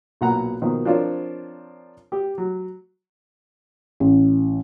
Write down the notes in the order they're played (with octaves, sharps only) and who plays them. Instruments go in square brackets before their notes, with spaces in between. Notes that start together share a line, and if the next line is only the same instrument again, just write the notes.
[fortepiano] B1 A#2 F#5 A#5
B2 D#3 F3 A#3
F3 C4 D4 F4 A#4 C#5
G4
F#3
[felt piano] A1